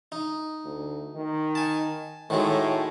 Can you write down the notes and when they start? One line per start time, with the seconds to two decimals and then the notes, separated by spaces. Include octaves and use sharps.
0.12 D#4
0.65 D2
1.15 D#3
1.55 G#5 A5
2.30 A2 D#3 F#3 G#3